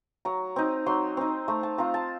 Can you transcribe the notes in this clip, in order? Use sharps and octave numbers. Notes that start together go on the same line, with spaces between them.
F#3 A#5
C4 D#4
F#3 C6
C4 D#4
A3 A#5
A5
C4 F4 A#5
A5